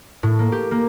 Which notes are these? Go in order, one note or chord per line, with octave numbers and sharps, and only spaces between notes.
A2
A#3
G4
A#3